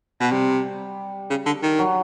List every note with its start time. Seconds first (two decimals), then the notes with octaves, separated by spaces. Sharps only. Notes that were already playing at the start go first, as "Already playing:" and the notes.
0.21 B2
0.32 C3 G3
1.30 C#3
1.46 D3
1.63 D#3
1.79 F#3